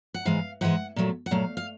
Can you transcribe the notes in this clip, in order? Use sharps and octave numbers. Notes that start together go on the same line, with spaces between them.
F#5
G#2 E3 G#3 F5
G#2 E3 G#3 F#5
A#2 F#3 A3
F#5
A#2 F#3 A3 F5
F5